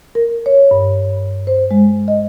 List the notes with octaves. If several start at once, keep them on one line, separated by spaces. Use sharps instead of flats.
A#4
C#5
G2
C5
G#3
D#5